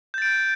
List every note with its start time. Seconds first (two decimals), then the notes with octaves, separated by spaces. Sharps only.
0.14 G6
0.18 A6
0.22 D7